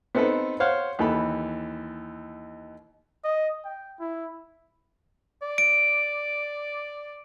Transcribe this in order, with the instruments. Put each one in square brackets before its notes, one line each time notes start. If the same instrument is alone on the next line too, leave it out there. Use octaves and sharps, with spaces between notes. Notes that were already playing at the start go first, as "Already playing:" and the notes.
[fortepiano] B3 C4 D#4 A4 B4
C5 C#5 F5 F#5
D#2 E3 A4 B5
[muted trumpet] D#5
G5
E4
[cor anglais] D5
[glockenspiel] D7